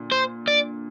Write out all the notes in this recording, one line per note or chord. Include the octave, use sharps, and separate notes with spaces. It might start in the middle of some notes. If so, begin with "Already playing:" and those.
Already playing: A#2 D3
C5
D5